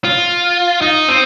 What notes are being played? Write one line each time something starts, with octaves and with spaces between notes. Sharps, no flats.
F4
D#4
C4